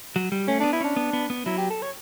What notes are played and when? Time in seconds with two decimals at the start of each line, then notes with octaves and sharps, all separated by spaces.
0.16 F#3
0.32 G3
0.48 A3 C#4
0.60 B3 D4
0.73 E4
0.81 C#4 D4
0.96 B3
1.13 B3
1.30 B3
1.46 F#3 E4
1.58 G4
1.70 A4
1.82 C#5